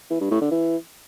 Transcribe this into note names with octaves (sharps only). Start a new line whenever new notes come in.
E3
G2
A2
D3
E3